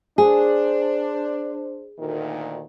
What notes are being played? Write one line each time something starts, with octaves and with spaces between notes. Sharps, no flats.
D4 G#4 C5
D2 A#2 D#3